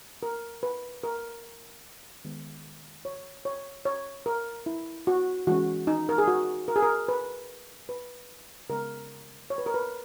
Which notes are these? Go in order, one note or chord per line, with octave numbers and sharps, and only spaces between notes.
A#4
B4
A#4
D#3 G#3 B3
C#5
C#5
C#5
A#4
E4
F#4
E3 G#3 C#4 F#4
D#4
A#4
G#4
F#4
A#4
G#4
A#4
B4
B4
C#3 G#3 B3 A#4
C#5
B4
A#4
B4